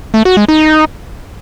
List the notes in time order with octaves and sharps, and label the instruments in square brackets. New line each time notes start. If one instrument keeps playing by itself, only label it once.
[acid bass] A3
F#4
G#3
D#4